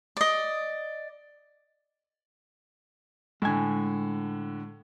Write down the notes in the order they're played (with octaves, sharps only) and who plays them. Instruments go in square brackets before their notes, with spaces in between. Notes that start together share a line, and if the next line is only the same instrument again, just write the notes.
[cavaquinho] D5 D#5
[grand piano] A2 D3 [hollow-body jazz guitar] G#3 G#5